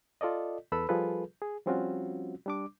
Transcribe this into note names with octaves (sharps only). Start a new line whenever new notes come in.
F4 A4 D5 D#5
E2 A4 B4 B5 E6
F3 G3 F4 G#4 A4 B4
G#4
F3 G3 C4 C#4 F4 F#4
G3 D4 D6